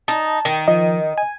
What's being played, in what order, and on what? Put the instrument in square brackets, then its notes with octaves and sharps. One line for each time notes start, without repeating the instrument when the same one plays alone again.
[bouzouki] D#4 [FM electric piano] A5
[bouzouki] D#3
[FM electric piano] F3 [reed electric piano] D#5
[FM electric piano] G#5